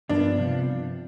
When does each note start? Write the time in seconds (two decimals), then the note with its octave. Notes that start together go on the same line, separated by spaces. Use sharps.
0.09 G2 F3 B3 D4
0.38 C3 F3 B3 D4 F4